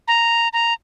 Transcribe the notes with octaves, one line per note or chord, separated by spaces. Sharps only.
A#5
A#5